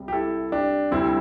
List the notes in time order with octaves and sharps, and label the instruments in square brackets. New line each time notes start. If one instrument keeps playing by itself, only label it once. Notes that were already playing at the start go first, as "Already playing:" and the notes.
Already playing: [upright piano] C2 C3 G3
[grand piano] G4
E4 A4
D4 G4
[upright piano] D2 C3 G3 [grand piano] C4 E4